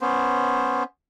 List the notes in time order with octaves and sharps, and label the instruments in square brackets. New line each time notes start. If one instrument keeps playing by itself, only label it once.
[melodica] B3 C#4 C5